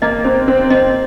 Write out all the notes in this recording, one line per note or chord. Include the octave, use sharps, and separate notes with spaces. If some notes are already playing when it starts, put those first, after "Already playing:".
A#3 D#5
C4 C5
C4 C5
C4 D#5